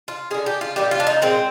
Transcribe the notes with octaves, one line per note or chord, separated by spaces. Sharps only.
F4
D3 G#3 G#4
G4
F4
A#2 G3 G4
F4
D4
D#4
A#2 G#3 C4